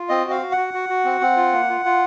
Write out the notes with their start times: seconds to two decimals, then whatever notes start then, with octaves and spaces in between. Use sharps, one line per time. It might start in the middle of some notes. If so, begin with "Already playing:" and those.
Already playing: F4
0.09 C4 D#5
0.25 F#4
0.30 F5
0.42 F#4
0.52 F#5
0.57 F#4
0.74 F#4
0.89 F#4
1.05 C4
1.21 C4
1.37 F4
1.53 A#3
1.69 F4
1.85 F4